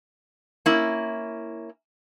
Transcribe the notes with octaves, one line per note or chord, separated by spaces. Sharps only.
A#3 C#4 E4